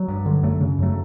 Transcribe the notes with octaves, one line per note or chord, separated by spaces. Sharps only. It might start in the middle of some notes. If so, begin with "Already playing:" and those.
Already playing: F#3
G2
D3
F#2 F#3 A3
C#3
F#2 F#3 A3